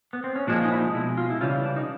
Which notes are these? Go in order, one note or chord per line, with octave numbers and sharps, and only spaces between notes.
B3
C4
C#4
A#2 F3 G#3 D4
D#4
E4
D#4
B2 G#3 E4
F4
E4
C#3 E3 G3 F4
D4
D#4